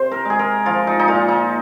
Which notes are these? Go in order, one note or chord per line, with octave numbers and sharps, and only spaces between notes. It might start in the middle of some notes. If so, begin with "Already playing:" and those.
Already playing: C3 C5
A#4
G#3 G#4
A#4
F3 F4
D#4
D#4
A#2 F4
D#4